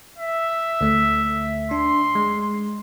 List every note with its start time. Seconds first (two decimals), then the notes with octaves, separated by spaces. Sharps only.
0.18 E5
0.81 D2 A3
1.71 D4 C6
2.15 G#3